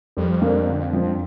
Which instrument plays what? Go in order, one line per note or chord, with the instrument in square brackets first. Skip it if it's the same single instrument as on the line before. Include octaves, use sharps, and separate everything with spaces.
[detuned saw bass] F2 [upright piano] G3
[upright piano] A#3 D4
D3
F3 C4